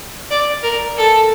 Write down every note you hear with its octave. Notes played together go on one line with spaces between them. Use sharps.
D5
A#4
A4